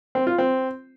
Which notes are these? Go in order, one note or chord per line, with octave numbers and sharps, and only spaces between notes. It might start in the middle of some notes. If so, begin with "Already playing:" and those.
C4
F4
C4